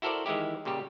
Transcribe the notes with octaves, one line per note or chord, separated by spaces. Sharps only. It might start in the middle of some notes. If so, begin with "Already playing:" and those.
E4 F#4 A4 A#4 C5 D5
D#3 E3 G#3 E4 G4
A#2 C#3 G3 G4